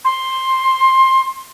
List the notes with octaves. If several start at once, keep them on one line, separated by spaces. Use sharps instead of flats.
C6